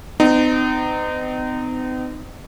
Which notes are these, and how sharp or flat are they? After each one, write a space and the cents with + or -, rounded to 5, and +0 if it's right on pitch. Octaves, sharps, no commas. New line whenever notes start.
C4 -45 D#4 -20